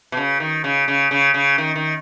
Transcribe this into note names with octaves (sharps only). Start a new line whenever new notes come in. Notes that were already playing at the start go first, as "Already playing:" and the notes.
B2
C#3
D#3
C#3
C#3
C#3
C#3
D#3
D#3